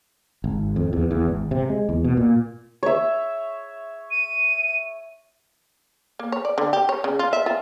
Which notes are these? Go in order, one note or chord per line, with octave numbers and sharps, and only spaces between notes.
G#1
F2
E2
E2
G#1
C3
G#3
E2
B2
A#2
C#5 E5
D#7
A#3
C#5
D5
D3
G4
C#5
C#3
F4
E5
F4